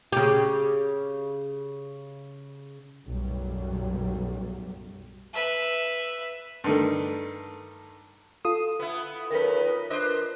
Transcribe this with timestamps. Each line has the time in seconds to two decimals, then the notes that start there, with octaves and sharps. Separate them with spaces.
0.12 C#3 G4
3.07 B1 F#2 A2 F#3 G3
5.33 B4 E5
6.64 G2 D#3 A3
8.45 F4 A4 D#6
8.79 B3 E4
9.30 F#2 D#3 A#4 B4
9.90 D4 C5 D#5